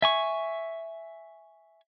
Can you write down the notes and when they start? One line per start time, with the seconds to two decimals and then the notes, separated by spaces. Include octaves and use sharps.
0.02 E5 G#5 C#6